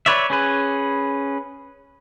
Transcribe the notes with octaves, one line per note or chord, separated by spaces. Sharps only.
B4 C#5 D5 E5
C#4 G#4 B4